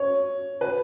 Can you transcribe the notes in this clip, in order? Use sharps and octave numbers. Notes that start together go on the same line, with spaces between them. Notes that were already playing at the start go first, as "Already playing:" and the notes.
Already playing: C#5
B4